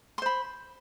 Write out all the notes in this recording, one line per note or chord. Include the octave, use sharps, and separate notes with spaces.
C5 B5 C6